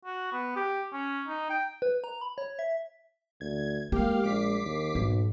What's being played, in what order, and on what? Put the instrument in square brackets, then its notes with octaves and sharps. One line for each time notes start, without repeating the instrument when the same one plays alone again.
[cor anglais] F#4
B3
G4
C#4
D#4
G5
[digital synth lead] B4
A#5
B5
C#5
E5
[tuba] D2 [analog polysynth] G#6
[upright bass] G#3 [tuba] A#3 [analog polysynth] G4 F5
[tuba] A#1 [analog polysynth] D6 B6 C7
[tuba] D#2
[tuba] B1 [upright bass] G#2